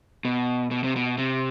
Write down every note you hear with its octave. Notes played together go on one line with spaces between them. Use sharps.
B2
B2
C3
B2
C3